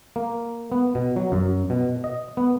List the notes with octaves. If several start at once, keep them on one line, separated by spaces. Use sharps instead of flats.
A#3
B3
B2
F#3
F#2
B2
D#5
B3